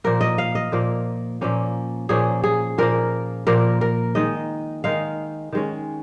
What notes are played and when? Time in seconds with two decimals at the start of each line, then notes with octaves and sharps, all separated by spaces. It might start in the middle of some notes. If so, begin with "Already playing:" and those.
0.04 A#2 F3 A#3 A#4
0.21 D#5
0.38 F5
0.55 D#5
0.72 A#2 F3 A#3 A#4
1.41 A#2 F3 A#3 C#4
2.09 A#2 F3 A#3 C#4 G#4
2.44 G#4
2.78 A#2 F3 A#3 A#4
3.47 A#2 F3 A#3 A#4
3.81 A#4
4.15 D#3 G#3 D#4 D#5
4.84 D#3 G#3 D#4 F5
5.52 D#3 G#3 C#4